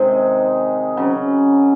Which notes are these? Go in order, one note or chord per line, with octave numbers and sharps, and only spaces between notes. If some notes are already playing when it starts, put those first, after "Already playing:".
Already playing: C3 D#3 G#3 D#4
C#3 F#3 C#4